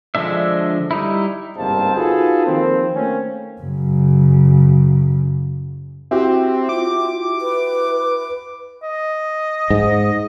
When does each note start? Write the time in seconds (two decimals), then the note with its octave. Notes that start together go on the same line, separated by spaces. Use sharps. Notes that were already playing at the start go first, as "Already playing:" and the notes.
0.15 D3 F3 G#3 D4 E5
0.91 G3 D#4 E4
1.57 G1 C2 G#2 A#3 C4 A5
1.95 D#4 F4 F#4 G#4 A4 B4
2.46 D#3 F3 A#3 C4
2.94 A3 A#3 C4 C#4
3.61 F#2 C#3
6.11 C4 E4 F#4 G4
6.69 F4 D6
7.41 B4
8.83 D#5
9.70 G#2